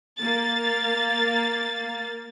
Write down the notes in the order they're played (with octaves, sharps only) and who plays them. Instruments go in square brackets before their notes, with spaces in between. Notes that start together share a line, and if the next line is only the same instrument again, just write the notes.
[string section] A#3 A6